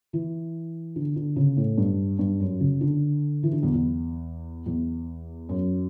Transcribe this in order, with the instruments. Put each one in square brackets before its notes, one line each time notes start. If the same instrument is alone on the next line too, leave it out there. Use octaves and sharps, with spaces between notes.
[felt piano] E3
D3
D3
C#3
A2
G2
G2
F#2
C#3
D3
E3
D3
E2
E2
E2
F#2